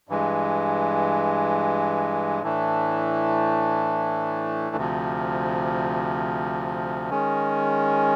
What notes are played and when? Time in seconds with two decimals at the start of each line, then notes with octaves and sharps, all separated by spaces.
0.09 G2 E3 G#3
2.42 A2 E3 A3 D4
4.76 D2 C3 F3
7.10 D#3 G#3 C#4